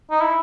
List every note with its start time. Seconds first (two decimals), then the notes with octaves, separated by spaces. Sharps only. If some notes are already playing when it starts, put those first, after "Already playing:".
0.11 D#4
0.21 E4